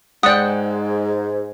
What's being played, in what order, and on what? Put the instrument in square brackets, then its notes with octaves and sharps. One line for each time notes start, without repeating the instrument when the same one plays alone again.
[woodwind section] G#2 [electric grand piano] G#3 [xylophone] D5 D#6 [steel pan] F#5 G5